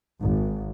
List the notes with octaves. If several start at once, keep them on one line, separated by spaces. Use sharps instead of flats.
G#1